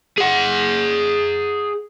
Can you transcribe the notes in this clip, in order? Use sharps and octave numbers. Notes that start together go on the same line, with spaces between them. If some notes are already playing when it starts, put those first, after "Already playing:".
G#4 F#5